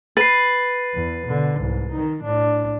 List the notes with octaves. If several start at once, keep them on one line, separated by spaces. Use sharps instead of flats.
B4 A6 C7
E2
B2 D3
C2 G#2
D#3 D#4
A2 D4